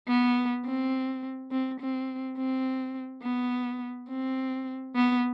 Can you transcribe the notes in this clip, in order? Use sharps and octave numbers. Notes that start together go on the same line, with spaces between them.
B3
C4
C4
C4
C4
B3
C4
B3